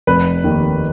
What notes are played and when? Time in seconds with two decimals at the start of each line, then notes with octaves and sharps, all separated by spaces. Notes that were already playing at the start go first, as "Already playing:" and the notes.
0.07 F1 B4
0.44 D#2 D#3 A#3